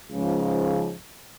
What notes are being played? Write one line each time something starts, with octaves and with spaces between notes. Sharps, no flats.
C#2 G#2 C#3 F3